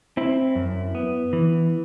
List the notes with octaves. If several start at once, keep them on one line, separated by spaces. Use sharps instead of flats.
C4 E4
F#2
B3
E3